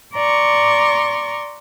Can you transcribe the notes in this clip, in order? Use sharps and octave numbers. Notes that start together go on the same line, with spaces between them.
D5 A#5 C6 C#6